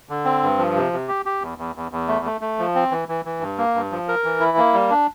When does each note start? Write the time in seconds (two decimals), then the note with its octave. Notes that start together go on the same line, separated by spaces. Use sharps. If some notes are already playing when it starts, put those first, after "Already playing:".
0.09 D3
0.25 C4
0.43 G2
0.58 F3
0.76 C3
0.93 C3
1.08 G4
1.26 G4
1.42 E2
1.58 E2
1.76 E2
1.91 E2
2.08 A3
2.25 A3
2.41 A3
2.59 F3
2.75 C4
2.91 E3
3.08 E3
3.25 E3
3.41 G2
3.58 A#3
3.75 G2
3.92 F3
4.08 A#4
4.24 E3
4.40 E4
4.57 A#3
4.74 G3
4.90 D4